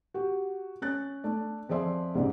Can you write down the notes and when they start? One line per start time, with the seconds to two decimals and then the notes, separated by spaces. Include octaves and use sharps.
0.14 F#4 G4
0.82 C#4 F#6 A6
1.24 A3 D4 D5
1.69 F2 F3 G#4 D5 E5 C6
2.15 C2 G#2 C#3 D5